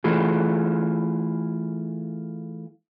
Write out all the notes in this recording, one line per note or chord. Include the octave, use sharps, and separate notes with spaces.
E3 A3 F4 G#4